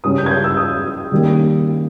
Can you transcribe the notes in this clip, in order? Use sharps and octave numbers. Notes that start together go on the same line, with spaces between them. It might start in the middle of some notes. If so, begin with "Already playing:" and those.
C#3 G3 C#4 D#6
G6
G#6
G6
E6
D#6
D#3 G3 A#3 C#4